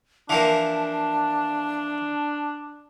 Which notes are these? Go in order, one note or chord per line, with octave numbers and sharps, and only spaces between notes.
E3 F3 A#3 D4 A5